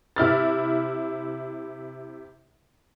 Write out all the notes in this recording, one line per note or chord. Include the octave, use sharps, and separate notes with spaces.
C3 E4 F6 A6